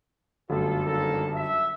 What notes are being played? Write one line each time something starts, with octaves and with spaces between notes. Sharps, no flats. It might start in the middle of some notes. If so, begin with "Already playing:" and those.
G1 F#2 A3 F4 A4
G#1 A#3 A4
E5